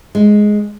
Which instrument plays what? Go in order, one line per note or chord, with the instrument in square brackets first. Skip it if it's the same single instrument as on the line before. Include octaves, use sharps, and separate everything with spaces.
[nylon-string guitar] G#3